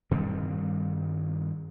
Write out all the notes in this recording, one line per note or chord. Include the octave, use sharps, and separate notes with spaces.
G2 D#3 G3 C4